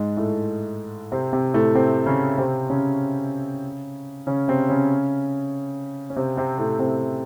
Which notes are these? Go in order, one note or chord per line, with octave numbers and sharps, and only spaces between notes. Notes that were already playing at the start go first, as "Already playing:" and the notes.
Already playing: G#2 G#3
A2 A3
C3 C4
C3 C4
A2 A3
C3 C4
C#3 C#4
C3 C4
C#3 C#4
C#3 C#4
C3 C4
C#3 C#4
C#4
C3 C4
C3 C4
A2 A3
C3 C4